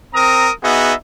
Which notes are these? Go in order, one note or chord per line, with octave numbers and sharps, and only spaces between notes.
C4 A#4 A#5 D#6
B3 D#4 F#4 G#4 E5